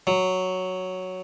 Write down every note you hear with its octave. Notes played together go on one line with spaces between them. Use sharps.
F#3